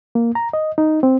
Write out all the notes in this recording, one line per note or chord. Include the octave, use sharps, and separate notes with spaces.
A#3
A#5
D#5
D#4
C4